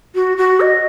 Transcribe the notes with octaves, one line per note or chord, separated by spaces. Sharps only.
F#4
F#4
D#5